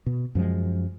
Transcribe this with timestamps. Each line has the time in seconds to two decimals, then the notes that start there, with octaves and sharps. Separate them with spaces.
0.06 B2
0.35 F#2 F3 G3 G#3